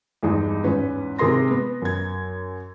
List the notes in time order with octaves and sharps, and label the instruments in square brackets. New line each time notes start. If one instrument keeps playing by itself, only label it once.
[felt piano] E2 G2 G#3 D#4
E2 G#2 C#4 B4
G#2 C3 G#4 A#4 C6 A#6
B3
F#2 G#6